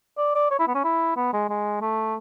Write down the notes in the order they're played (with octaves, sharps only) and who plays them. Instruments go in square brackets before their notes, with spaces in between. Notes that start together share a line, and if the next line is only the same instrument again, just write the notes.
[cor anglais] D5
D5
C#5
E4
B3
C#4
E4
B3
G#3
G#3
A3